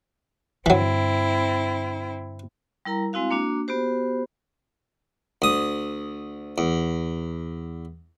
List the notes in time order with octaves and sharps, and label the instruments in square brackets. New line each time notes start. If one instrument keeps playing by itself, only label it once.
[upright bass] G2 D3 [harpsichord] E3 F#3 [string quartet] C4 E4
[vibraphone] G3 E4 A#4 A#5
G#3 C4 E4 F#4 F5
A#3 D4 F#4
B3 F#4 G4 C5
[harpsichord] D2 D#6
E2